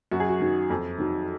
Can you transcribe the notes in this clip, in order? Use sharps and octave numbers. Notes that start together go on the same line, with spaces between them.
F#2 F#4
G#4
F#4
D#3 F#3
F2
D#3 F#3